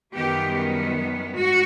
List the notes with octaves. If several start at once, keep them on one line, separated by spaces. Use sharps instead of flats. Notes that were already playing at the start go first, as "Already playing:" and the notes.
F#2 D#3 G3 B3 G4
G#2 F#4